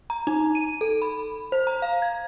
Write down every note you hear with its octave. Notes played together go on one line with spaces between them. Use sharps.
A#5
D#4
D#7
A4
B5
C5
A#5
F5
G#6